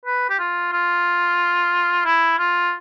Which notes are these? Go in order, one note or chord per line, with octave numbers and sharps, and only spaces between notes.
B4
G4
F4
F4
E4
F4